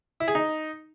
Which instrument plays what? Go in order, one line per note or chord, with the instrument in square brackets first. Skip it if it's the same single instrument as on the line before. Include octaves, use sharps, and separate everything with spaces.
[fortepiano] E4
G#4
D#4